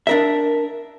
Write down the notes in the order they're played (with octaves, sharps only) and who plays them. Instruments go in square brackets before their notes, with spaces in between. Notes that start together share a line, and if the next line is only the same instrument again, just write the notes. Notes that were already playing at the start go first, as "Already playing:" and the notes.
[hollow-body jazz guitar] D4 A#4 E5